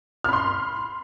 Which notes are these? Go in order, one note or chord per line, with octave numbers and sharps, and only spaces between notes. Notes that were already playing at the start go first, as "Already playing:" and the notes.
B5 C6 F6